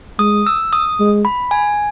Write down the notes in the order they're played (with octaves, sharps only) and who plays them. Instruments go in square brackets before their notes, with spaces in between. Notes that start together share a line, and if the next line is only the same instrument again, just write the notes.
[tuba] G#3 [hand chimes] D#6
[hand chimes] E6
D#6
[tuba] G#3
[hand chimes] B5
G#5